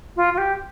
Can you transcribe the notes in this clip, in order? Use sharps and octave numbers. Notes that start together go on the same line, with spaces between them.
F4
F4
G4